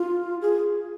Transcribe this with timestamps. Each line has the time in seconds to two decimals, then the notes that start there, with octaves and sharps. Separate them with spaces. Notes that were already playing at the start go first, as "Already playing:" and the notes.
Already playing: F4
0.41 G#4